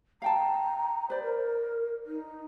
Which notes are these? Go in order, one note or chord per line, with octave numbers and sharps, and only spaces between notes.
F5 G5 A5 A#5
B4 C5 D5
A#4
D#4